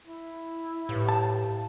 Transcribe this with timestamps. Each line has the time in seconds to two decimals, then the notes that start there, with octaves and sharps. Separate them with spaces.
0.05 E4
0.89 A2 G4 B4 F5
1.09 A5